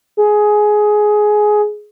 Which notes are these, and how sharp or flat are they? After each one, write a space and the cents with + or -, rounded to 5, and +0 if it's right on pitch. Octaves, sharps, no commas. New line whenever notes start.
G#4 +15